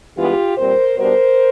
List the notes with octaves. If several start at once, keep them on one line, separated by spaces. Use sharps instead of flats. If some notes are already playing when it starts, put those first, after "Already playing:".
G2 E3 G#3 B3 F4 G4
A#2 G3 C4 A#4 C5
B2 G3 B3 D4 A#4 C5